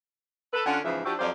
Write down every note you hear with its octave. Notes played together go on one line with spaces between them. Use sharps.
A4 B4
D3 C#4 F4 F#5
G#2 C#3 E3 F3 G#4 E5
F3 D4 E4 F#4 G4
F2 F#3 G4 C5 D5 F5